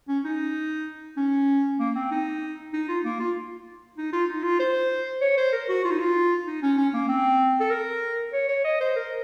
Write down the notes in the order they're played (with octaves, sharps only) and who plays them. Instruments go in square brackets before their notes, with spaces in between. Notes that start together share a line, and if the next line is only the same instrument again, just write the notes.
[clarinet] C#4
D#4
C#4
A#3
C4
D#4
D#4
F4
A#3
F4
D#4
F4
D#4
F4
C5
C#5
C5
A#4
F#4
F4
D#4
F4
D#4
C#4
C#4
A#3
C4
A4
A#4
C#5
C#5
D#5
C5
A#4